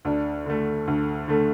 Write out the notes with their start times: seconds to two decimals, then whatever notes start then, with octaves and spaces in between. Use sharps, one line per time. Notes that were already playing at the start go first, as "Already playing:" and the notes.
0.05 D2 D4
0.46 D3 A3
0.87 D2
1.28 D3 A3